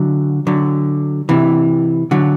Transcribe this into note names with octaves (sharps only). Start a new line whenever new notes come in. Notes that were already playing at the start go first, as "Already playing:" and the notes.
Already playing: D3 F#3
D3 F#3
C3 E3
D3 F#3